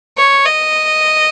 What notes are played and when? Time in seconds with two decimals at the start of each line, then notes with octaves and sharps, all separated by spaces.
0.18 C#5
0.46 D#5